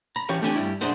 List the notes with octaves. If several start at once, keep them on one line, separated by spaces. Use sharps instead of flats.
A#5 B5
E3 C#4 G4 C#5 F5
A3 C4 D4 G4 G5 G#5
G2 G3 E4
B1 F#2 D4 G#4 C5 F#5